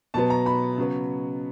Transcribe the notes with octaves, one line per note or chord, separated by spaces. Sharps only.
B2 F#3 B3 A5
A#5
B5
C#3 F#3 B3